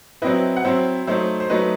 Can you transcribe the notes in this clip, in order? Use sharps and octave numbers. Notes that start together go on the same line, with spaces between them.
F#3 C4 E4 B4 D#5
F#5
F#3 C4 E4 C5 E5
F#3 A3 D#4 C5 E5
C5
F#3 A3 D#4 B4 D#5